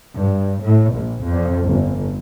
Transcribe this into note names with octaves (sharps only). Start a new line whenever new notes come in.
G2
A2
A#1
F2
G1